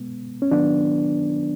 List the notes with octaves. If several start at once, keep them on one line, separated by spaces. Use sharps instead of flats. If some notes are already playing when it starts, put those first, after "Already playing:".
Already playing: B2 G#3 B3
C#4
D#3 F#3 B3 D4